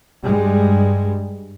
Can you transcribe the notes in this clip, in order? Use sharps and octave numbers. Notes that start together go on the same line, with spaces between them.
G2 G3 G#3